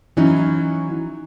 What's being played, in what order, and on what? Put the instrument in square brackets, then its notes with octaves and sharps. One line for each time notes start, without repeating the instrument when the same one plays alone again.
[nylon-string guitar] E3 F#3 C#4 D#4